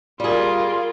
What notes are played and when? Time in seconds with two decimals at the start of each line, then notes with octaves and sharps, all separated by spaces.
0.20 G3 F4 G#4 A#4